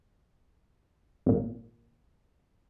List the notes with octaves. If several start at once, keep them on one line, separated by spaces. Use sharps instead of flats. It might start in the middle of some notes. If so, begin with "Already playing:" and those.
G#1 A#2